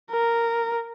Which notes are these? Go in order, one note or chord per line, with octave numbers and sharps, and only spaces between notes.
A#4